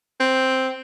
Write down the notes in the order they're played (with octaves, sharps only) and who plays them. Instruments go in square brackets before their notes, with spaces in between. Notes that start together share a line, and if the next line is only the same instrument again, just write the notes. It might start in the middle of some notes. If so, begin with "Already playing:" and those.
[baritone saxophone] C4